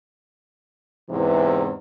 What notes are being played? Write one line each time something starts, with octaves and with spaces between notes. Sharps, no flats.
E2 G#2 C3 E3